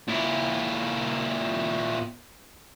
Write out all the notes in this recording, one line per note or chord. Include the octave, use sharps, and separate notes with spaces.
A#2 E4